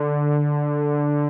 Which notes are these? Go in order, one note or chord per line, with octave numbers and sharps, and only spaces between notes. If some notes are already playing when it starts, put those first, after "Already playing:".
Already playing: D3